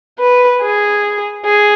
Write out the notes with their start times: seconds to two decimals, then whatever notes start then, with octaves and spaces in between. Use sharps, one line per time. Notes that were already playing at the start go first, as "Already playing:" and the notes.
0.19 B4
0.62 G#4
1.45 G#4